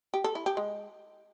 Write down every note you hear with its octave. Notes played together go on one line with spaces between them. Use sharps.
G4
A4
E4
G4
G#3